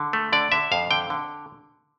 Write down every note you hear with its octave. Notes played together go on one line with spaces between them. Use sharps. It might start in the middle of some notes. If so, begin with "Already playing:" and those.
Already playing: D3
A3
D3 D5
D3 E5
F2 F5
D3 G5
D3